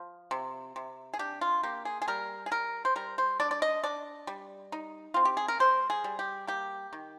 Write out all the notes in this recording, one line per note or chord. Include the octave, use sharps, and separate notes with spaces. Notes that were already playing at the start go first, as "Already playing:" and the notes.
Already playing: F3
C3
C3
G#4
D4 G4
F4
A#3 G4
G#4
G#4
G3 A#4
G#4
G3 A#4
C5
G3 A#4
C5
D4 D5
D5
D#5
D4 D5
G3
D#4
C4 F4
G4
G#4
A#4
G3 C5
G#4
G3
G4
A#3 G4
D#3